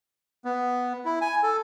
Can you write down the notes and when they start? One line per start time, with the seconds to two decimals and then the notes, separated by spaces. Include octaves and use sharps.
0.45 B3
1.05 E4
1.21 G#5
1.43 A4